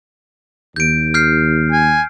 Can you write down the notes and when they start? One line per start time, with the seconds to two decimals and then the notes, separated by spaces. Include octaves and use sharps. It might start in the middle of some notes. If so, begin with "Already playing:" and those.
0.76 D#2 G6 D7
1.14 F6 G6 C7
1.72 G#5